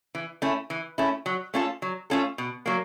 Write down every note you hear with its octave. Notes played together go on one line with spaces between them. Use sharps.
E3
A3 C#4 E4
E3
A3 C#4 E4
F#3
A3 C#4 F4 A4
F#3
A3 C#4 F4 A4
B2
F#3 A#3